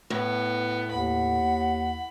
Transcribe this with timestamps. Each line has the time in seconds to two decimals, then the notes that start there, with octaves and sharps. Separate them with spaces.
0.10 A2 B3
0.91 D#2 F#5 B5